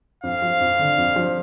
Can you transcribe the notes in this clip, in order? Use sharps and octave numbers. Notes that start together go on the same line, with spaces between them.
F2 F5
F3
F2
D3
F2
F3